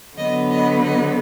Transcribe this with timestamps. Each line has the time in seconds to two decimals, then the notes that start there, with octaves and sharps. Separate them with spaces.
0.17 D3 F#3 B3 D#5
0.51 D#5
0.83 D#5